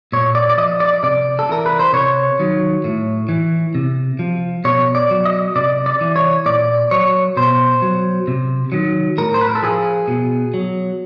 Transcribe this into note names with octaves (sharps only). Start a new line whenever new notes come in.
A#2 C#5
D5
D5
F3 D#5
D5
C3 D5
A4
E3 A#4
B4
C5
C3 C#5
D#3 F#3
A2
E3
C3
F3
B2 C#5
D5
F#3
D#5
C3 D5
D5
E3
C#5
A#2 D5
F#3 C#5
B2 C5
F#3
C3
D#3 F#3
A2 A#4
C5
B4
A#4
A4
F3 G#4
B2
F#3